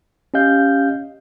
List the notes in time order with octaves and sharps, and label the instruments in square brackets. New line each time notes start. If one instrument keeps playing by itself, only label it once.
[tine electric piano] C#4 G4 D#5 F5 G6